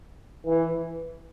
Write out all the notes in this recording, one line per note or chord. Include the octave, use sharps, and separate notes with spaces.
E3